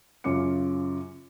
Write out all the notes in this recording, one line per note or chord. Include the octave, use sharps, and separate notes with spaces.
F#2 C#3 C#4 F4 D6 C#7